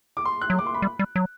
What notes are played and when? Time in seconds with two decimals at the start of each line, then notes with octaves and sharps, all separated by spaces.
0.17 D6
0.25 C6
0.41 F#6
0.50 F#3
0.59 D6
0.66 C6
0.74 B5
0.82 G3
0.99 G3
1.16 F#3